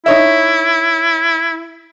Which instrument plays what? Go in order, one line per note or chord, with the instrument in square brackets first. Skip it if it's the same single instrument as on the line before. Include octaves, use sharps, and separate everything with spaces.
[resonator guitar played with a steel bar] D#4 C#5 E5 [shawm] E4